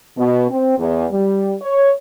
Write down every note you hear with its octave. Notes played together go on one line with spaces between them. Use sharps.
B2
C4
E2
G3
C#5